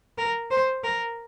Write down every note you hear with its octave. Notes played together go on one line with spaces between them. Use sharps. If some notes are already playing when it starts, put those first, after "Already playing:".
A#4
C5
A#4